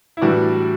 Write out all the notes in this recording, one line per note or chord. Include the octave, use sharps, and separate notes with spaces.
E4
A2 E3 G3 D4 F#4